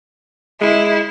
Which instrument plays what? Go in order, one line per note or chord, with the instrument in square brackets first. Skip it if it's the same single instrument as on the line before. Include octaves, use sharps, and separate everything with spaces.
[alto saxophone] G#3 [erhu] E4